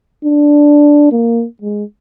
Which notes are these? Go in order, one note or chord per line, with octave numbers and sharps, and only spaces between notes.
D4
A#3
G#3